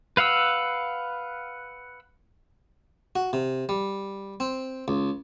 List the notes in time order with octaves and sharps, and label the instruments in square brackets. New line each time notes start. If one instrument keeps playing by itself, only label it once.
[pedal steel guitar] B4 F5 F#5 E6
[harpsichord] F#4
C3
G3
C4
C#2